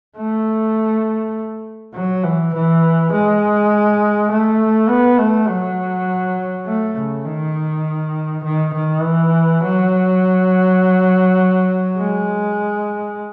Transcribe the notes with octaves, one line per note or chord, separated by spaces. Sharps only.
A3
F#3
E3
E3
G#3
A3
B3
A3
F#3
A3
C#3
D#3
D#3
D#3
E3
F#3
G#3